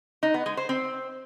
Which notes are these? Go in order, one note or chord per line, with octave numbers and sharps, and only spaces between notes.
D#4
B3
G#3
C5
C4